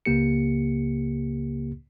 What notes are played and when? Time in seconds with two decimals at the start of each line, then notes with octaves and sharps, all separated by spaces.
0.05 C#2 C#3 A#3 G4 C#7